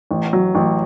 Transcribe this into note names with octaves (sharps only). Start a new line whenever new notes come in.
A1
F#3
A1